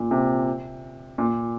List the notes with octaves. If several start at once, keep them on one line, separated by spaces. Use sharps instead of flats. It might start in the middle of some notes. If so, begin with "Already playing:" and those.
Already playing: A#2
C3
A#2